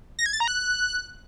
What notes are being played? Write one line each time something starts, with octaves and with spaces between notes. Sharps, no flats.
A#6
G#6
A6
A#5
F#6